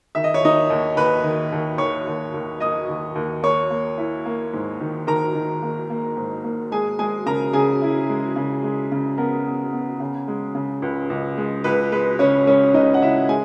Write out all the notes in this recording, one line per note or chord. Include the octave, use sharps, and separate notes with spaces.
D#3 E5
D#5
C#5
D#2 D#4 D#5
D#2
D#2 B4 B5
D#3
D#2
D#3 C#5 C#6
D#2
D#2
A#3 D#5 D#6
D#2
D#2
A#3 C#5 C#6
A#3
E4
A#3
G#2
D#3
D#3 A#4 A#5
D#3
A#3
A#3
G#2
A#3
G#3 G#4 G#5
G#3 G#4 G#5
C#3 A#4 A#5
C#3 G#4 G#5
E4
G#3
C#3
G#3
C#3
B3 A#4
B3
B3
C#3
G#3
C#3
C#2
C#2
G#3
C#2 B4
G#3 B4
C#3 C#4 C#5
G#3 C#4 C#5
C#2 D#4 D#5
F#5
C#2 E4 E5
G#3 G#4 G#5